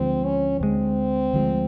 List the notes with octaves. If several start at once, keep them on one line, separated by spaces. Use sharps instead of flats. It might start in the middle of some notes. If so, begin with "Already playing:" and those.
Already playing: D2 D3 F3 G#3 C4
C#4
D2 D3 F3 G#3 C4
D2 D3 F3 G#3